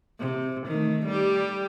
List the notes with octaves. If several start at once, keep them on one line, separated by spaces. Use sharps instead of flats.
C3
D#3 A3
G3 G4